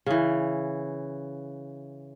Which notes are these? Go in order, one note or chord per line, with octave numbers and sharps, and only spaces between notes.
C#3 E3